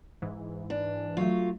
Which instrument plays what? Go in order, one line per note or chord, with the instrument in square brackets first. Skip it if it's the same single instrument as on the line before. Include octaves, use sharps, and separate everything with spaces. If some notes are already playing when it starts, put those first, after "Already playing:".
[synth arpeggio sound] G#2 E3
[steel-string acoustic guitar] D4
[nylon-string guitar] F#3 A3 [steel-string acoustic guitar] F4